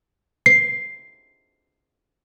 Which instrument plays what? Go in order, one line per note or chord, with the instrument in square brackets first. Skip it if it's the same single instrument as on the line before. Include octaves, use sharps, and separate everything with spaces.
[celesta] C7